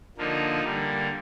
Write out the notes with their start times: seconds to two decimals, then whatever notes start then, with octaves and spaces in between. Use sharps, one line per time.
0.17 D3 F3 A#3 D#4
0.64 D3 G3 A#3